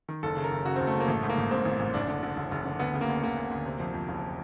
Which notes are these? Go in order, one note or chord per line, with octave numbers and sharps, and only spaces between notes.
D#3
F#1 A4
C#3
A#4
F#1
C#3 F#4
F#1 C4
A3
F#1
A#3
A1 A3
G#2
A#3
A1
G#2 C4
A1
A1
F#1 D4
D3
D3
F#1
F#1
D3
D2 B3
C#3
A#3
D2
D2 A#3
D2
D2
C3
F2
F2
F#1